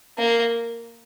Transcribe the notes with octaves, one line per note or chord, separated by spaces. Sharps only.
A#3